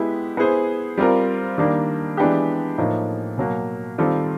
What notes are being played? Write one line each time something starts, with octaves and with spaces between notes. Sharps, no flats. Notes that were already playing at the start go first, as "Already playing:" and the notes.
Already playing: G#3 B3 E4 G4
B3 E4 G#4 C5
G3 C4 F4 A#4
D#3 G3 A#3 D4
E3 G#3 B3 D4 G4
A2 F3 A#3 D#4
B2 F#3 A#3
D#3 G3 C4 F4 A4